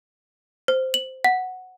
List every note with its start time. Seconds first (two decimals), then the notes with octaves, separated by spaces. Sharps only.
0.68 C5
0.94 F#7
1.24 F#5